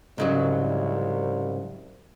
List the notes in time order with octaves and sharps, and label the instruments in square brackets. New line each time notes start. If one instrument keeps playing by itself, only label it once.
[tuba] C2 [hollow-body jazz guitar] G#2 C#3 F#3